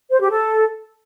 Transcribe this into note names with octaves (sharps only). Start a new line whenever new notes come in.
C5
G4
A4